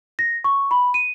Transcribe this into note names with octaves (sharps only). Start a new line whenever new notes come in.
A#6
C#6
B5
D#7